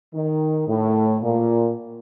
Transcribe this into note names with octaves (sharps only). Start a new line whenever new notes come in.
D#3
A2
A#2